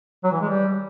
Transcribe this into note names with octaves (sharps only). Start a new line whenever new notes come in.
F#3
E3
G#3
G3